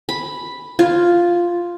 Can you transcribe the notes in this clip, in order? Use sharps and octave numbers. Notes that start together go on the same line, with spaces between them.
B5
F4